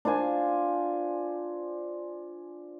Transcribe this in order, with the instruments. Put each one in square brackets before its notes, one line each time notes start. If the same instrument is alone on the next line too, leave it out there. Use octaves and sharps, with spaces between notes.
[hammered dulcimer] D4 F4 C5 G#5